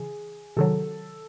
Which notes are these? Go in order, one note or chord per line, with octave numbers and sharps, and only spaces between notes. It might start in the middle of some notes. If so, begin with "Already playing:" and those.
Already playing: C#3 E3 G#4
C3 D#3 F#3 A4